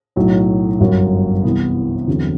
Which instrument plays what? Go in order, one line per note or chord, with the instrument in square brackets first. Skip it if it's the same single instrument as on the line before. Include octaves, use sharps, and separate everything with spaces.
[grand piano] B1 A2 F#3
G1 F#2 F#3
C2 C3 E3 B3
E2 D3 F#3 C4